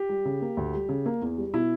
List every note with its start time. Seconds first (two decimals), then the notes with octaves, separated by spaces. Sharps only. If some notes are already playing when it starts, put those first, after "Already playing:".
Already playing: G4
0.09 G3
0.25 C#3
0.42 A#3
0.57 D2
0.74 G3
0.89 C#3
1.06 A#3
1.22 E2
1.38 G3
1.54 B2 E4